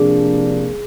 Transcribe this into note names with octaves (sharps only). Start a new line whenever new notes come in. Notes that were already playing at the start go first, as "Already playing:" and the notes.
Already playing: C3 F3 A#3 D4 G#4